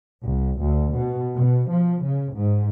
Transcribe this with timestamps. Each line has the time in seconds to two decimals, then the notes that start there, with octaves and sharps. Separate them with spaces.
0.24 C2
0.59 D2
0.96 B2
1.36 B2
1.71 F3
2.05 C#3
2.35 G#2